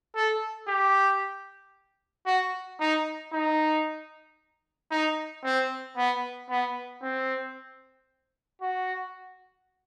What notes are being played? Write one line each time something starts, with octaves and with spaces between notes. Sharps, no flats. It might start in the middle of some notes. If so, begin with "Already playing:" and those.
A4
G4
F#4
D#4
D#4
D#4
C4
B3
B3
C4
F#4